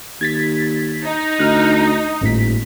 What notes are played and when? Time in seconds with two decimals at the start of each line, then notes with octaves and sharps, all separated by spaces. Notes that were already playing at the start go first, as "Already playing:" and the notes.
0.21 D#2 G#6 A6 B6
1.05 D#4
1.39 D2 F6 F#6
1.87 D#6
2.21 D#1 G#1 A2 B6